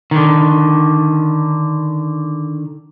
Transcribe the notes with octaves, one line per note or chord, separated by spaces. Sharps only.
D3 D#3